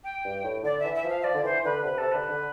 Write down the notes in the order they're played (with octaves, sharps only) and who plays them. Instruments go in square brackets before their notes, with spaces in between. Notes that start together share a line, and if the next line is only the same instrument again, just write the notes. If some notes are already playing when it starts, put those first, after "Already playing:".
[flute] G5
[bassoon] G2
A2
[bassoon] D3 [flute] D5
[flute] E5
[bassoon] E3
[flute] E5
[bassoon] F3 [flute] F5
[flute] E5
[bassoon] F3 [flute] D5
[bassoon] D3
[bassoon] E3 [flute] C5
[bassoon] D3 [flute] B4
[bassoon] C3 [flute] B4
[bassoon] C3 [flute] A4
[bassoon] D3 [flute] B4
[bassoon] D3